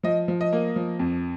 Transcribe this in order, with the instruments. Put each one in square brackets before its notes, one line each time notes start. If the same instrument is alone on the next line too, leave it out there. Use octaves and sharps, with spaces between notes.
[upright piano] F3 D#5
F3
D#5
A#3
F3
F2